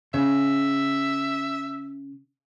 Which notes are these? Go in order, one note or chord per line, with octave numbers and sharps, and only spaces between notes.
C#3 E5